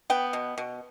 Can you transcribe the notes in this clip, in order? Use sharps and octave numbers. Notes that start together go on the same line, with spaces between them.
B3 G5
B2
B2